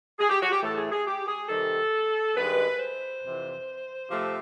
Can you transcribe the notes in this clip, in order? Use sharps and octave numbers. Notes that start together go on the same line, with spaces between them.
G#4
G4
F#4
G4
A2 E3 A3 A4
G#4
G#4
G4
G#4
C3 D#3 G3 A4
G2 D#3 G#3 B4
C5
F2 C3 E3
C3 F3 A3